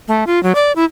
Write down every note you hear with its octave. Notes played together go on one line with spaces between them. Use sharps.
A3
F4
F#3
D5
E4